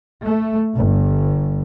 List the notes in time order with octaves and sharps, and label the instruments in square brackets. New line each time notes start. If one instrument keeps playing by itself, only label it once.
[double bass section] A3
G1